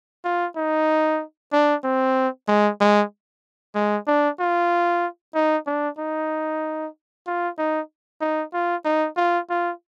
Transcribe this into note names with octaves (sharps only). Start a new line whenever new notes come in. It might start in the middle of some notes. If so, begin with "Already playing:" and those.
F4
D#4
D4
C4
G#3
G#3
G#3
D4
F4
D#4
D4
D#4
F4
D#4
D#4
F4
D#4
F4
F4